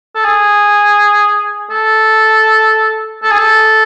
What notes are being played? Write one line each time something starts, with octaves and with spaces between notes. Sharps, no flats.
A4
G#4
A4
A4
G#4
A4